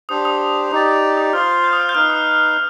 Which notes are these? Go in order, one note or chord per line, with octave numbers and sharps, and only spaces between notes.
D4 G4 C5 D#6
D#6
D#4 G4 D5
D#6
F4 C5 F5 F6
G6
D#6
F6
G6
D#4 B4 F5 F6
D#6